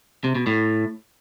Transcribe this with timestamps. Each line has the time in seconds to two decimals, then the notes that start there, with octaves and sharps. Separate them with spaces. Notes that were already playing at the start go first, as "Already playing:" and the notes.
0.24 C3
0.35 B2
0.47 A2